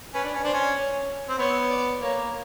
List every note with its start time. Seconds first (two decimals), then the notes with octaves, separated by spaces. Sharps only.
0.14 C#4 B4
0.24 D4
0.34 C#4
0.44 D4 C5
0.54 C#4
0.76 C#5
1.29 C4
1.38 B3 C#5
1.70 D5
2.01 A#3 C#5